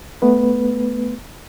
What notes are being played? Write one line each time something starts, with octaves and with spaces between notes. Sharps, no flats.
A3 B3 B4